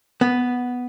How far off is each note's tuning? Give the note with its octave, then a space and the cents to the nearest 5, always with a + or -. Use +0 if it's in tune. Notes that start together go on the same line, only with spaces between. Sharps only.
B3 +0